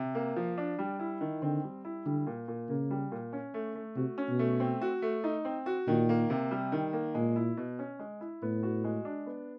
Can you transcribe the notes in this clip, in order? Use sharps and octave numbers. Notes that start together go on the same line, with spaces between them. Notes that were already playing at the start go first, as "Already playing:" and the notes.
Already playing: C3
A#3
F3
D4
G3
E4
D#3
D3 C4
G3
E4
D3 G3
A#2
A#2
C#3 A#3
G3
A#2
C#4
A3
A3
C3 F#4
C#4
B2
A3
C4
F#4
A3
D#4
C4
F#4
A#2 D#3
A#3
C3
G3
D#3
A#3
A#2 G#3
E4
B2
C#4
G#3
E4
A2 B3
F#4
G#3
D4
B3